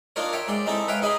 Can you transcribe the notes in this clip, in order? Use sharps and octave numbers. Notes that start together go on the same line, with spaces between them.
D4 D#4 F4 A#4 C#5
C#5 E5 G5
G#2 G#3 D5 C6
G#3 C4 D#4 E4 A4
B4 C#5 E5 F5 G5
D#4 G#4 D#5 G#5 B5 C6